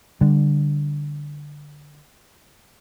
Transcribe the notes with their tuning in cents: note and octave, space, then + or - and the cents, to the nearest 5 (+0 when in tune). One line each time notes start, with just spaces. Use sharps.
D3 +0 G3 +15